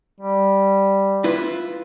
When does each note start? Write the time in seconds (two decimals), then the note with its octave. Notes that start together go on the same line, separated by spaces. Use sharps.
0.20 G3
1.24 E4 F4 B4